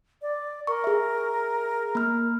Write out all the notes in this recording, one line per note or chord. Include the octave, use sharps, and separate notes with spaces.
D5
A#4 C#6
G#4 E5
A#3 F6